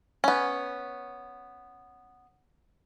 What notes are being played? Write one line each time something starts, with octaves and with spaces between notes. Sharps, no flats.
B3 C#4